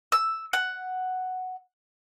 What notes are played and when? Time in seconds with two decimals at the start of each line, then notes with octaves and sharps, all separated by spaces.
0.12 E6
0.53 F#5